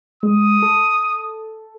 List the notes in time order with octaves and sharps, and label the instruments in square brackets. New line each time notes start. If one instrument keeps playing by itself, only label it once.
[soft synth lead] G#3 [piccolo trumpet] D#6
[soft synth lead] A4